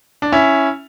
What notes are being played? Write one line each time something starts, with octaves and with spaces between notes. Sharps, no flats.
D4
C#4 E4